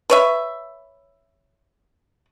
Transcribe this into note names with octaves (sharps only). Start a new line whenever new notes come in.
B4 C#5 E5